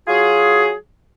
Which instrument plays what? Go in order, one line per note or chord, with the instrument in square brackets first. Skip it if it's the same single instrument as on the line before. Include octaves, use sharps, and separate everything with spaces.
[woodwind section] F#3 F4 F#4 G#4